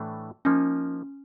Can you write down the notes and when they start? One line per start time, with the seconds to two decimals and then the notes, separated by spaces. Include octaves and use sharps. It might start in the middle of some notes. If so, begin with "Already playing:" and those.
Already playing: A2 E3 A3 D4
0.45 F3 A#3 C#4 D#4